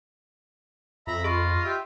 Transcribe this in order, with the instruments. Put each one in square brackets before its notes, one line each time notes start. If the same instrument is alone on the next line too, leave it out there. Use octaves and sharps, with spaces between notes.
[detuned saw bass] F2 [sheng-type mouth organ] E5 A#5 B5
[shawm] F4 [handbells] G#4 B5 C#6 [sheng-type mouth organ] D#5
[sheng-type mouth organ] G4 E5 G5